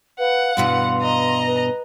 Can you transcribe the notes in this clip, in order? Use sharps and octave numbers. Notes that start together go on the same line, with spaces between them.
B4 F5 F#5
G2 B2 E3 C6
D#5 A#5
B4